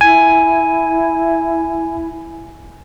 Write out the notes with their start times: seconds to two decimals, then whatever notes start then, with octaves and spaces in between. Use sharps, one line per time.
0.01 E4 G#5